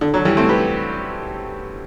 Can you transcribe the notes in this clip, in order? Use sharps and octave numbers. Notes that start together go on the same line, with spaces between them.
D3
D3 F#3
E3 G3
A3 C4
G4 B4